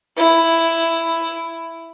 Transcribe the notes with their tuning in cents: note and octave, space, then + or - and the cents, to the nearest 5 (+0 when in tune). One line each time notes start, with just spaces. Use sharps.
E4 +5